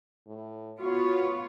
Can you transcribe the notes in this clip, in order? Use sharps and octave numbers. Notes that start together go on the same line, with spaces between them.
A2
B3 F4 F#4 C#5